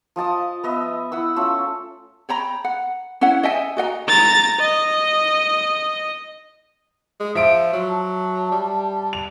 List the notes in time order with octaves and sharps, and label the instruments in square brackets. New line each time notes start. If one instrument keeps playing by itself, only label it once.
[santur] F3 D#5 A5 D#6
B3 D#5 E5
E4 F#5 E6
A3 C#4 F4 A4
[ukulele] C#5 G5 A#5 B5
F#5
C#4 E4 C#5 F#5
D#5 E5 G5 G#5
F#4 D#5 F#5 A#5
[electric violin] A#5 A6
D#5
[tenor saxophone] G#3
[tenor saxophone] F3 [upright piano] E5 D7
[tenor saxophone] F#3
[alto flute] A5
[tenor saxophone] G3
[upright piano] F7